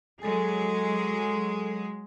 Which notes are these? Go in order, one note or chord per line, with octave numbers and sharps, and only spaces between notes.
F#3 G#3 G#4 A4 G#5